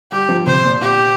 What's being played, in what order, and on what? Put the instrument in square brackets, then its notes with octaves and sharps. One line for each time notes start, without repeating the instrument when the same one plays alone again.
[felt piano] G3 [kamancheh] G4
[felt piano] F3
[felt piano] C3 [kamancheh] C5
[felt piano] A#2
[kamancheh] G4